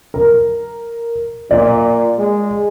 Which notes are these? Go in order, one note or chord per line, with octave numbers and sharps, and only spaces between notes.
A#4
A#2 D5
G#3